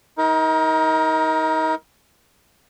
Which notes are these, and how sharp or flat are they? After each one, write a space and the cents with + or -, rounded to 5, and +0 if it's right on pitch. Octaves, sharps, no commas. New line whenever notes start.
D#4 +30 A#4 +5